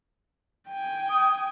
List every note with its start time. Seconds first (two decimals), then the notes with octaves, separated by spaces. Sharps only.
0.69 G5 G#5
1.10 D#6